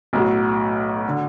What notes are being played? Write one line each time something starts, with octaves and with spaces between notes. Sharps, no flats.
B1 A2 F#3
D3